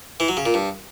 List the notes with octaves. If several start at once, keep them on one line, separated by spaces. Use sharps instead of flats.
E3
F#3
C#3
A#2
G2